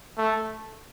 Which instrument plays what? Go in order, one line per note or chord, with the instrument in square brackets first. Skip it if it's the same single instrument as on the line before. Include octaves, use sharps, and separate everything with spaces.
[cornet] A3